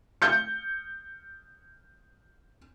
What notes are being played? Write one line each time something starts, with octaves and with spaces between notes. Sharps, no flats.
G6 C#7